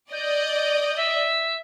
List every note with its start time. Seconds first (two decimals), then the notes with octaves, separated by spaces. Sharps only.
0.12 D5 D#5 G6
0.96 E5